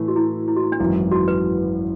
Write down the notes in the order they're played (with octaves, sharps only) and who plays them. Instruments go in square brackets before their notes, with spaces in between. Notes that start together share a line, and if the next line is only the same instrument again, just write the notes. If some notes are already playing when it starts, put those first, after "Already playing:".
Already playing: [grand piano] A2 E3 A3
[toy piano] F#4
E4
E4
F#4
E4
D4
[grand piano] G#1 F#2 E3 [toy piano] E4
[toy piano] F#4
B4